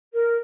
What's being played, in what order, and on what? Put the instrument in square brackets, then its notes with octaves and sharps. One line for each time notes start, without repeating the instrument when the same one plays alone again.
[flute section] A#4